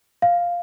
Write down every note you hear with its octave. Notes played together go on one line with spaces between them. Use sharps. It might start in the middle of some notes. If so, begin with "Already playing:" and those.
F5